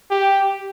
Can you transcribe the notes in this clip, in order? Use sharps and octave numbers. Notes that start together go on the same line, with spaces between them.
G4